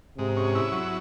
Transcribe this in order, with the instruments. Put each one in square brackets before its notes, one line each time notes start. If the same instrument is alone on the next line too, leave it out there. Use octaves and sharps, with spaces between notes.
[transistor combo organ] G#2 [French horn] C3
[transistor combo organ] C#4
E4
F#3